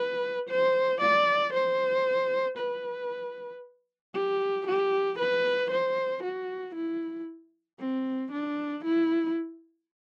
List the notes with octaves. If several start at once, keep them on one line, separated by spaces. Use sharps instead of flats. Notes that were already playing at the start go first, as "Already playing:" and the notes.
Already playing: B4
C5
D5
C5
B4
G4
G4
B4
C5
F#4
E4
C4
D4
E4